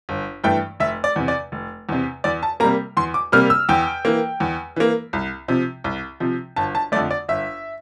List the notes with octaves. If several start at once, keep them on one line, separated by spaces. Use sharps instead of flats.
G1
G2 E3 A3 G5
F1 E5
D5
E2 C3
D5
F1
E2 C3
E2 D5
A5
C3 G3 A#3 A#5
E2 C6
D6
C3 G3 A#3 F6
E6
E2 G5
E3 A#3
E2
E3 A#3
C2
C3 F3
C2
C3 F3
G1 A5
A5
F2 D3 A3 D5
D5
G1 E5